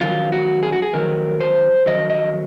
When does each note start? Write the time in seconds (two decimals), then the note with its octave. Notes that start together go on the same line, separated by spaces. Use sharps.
0.01 F2 D#3 F#3 F4
0.32 F#4
0.63 G#4
0.72 F#4
0.82 G#4
0.93 F2 D#3 F#3 A#4
1.40 C5
1.86 F2 D#3 F#3 D#5
2.10 D#5